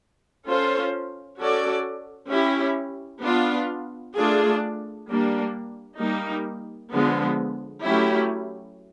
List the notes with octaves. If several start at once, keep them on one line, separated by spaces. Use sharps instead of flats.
C#4 F4 A4 C5
C#4 F#4 A4 D5
C#4 E4 G4
B3 D4 F4
A3 D4 F4 G#4
G3 A#3 D4
G3 A#3 D#4
D3 F3 G#3 B3
F#3 A3 C#4 E4 G4